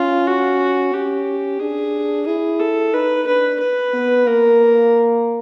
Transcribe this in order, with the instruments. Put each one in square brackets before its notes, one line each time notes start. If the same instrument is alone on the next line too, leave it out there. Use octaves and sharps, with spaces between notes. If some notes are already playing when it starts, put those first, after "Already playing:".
Already playing: [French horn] C#4 [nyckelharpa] F4
[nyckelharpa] F#4
[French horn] C#4 [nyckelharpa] G4
[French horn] D4 [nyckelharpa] G#4
[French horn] E4 [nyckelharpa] G#4
[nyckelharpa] A4
[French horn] D#4 [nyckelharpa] B4
[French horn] D4 [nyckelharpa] B4
[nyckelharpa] B4
[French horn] B3
[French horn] A#3 [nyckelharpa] A#4